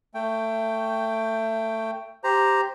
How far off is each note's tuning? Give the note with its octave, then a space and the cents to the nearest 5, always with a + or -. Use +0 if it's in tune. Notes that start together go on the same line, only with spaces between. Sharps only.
A3 +20 G5 +0
G4 +0 C5 +0 A#5 +0